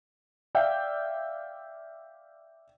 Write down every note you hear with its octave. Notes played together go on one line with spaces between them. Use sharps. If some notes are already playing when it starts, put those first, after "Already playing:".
D5 E5 F5 G5